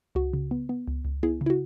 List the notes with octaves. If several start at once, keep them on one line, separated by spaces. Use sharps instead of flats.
C#2 F#4
C#3
B3
B3
C#2
C#2
B3 E4 G#4
C#3
E4
F#4